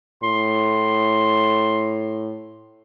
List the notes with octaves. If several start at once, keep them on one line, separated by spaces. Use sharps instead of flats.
A2 C6